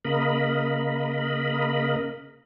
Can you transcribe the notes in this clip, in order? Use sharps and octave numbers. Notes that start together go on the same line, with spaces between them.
C#3 A#3 A#4 D#5 B5